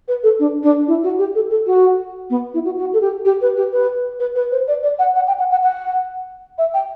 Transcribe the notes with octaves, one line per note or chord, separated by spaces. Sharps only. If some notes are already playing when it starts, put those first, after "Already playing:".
B4
A4
D4
D4
E4
F#4
G4
A4
A4
F#4
B3
E4
F#4
F#4
A4
G4
G4
B4
G4
B4
B4
B4
C5
D5
D5
F#5
F#5
G5
F#5
F#5
F#5
E5
G5